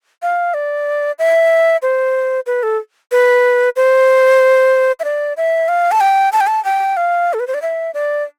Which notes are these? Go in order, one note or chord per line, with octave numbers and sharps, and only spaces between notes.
F5
D5
E5
C5
B4
A4
B4
C5
E5
D5
E5
F5
A5
G5
A5
G5
A5
G5
F5
A4
B4
C5
D5
E5
D5